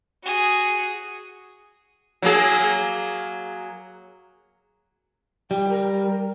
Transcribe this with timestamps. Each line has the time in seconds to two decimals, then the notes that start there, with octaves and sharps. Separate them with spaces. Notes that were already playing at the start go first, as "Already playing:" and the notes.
0.23 F#4 G#4
2.22 F#3 A#3 G#4
5.51 G3 G5
5.69 A#4